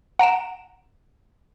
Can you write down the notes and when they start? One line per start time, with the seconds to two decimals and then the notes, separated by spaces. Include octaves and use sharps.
0.19 F#5 A#5 D7 E7